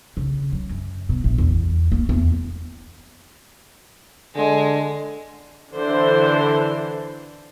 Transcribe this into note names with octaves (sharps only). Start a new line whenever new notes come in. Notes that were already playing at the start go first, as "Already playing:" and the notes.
C#3
F#3
F#2
B2
A1
E2
A#3
E2
D3 G#3
D3 E3 D4 C5